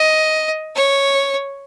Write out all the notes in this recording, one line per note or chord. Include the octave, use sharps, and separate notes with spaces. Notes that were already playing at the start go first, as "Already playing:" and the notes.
Already playing: D#5
C#5